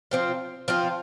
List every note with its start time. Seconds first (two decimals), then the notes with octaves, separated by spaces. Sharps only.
0.11 F3 C4 F4
0.68 F3 C4 F4